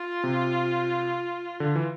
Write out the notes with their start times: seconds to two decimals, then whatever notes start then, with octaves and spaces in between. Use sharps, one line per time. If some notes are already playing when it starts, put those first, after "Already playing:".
Already playing: F4
0.24 C3
1.60 D3
1.75 E3